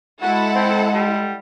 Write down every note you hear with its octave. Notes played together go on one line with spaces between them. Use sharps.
G#3 E4 F#4 A4 F#5
C4
G3